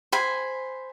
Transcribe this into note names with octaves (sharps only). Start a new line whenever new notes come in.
C5 G#5 B5